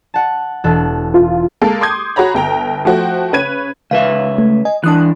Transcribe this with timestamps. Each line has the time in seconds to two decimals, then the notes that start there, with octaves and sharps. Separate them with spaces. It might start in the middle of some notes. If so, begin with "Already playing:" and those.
0.14 F#5 A5
0.64 E1 A4 F#6
1.14 F4
1.62 G#3 A#3 A4
1.81 C6 D6 D#6 G6 G#6
2.16 F#4 G#4 C#5 A#5 B5
2.35 G1 G5 A#5
2.85 F3 A3 F#4 C5 G5
3.33 C#3 B4 C#5 G#6 D#7
3.91 C#2 B4 E5 F5
4.38 A3
4.65 D#5 G#5
4.84 E3 D4 A5 D#6 F#6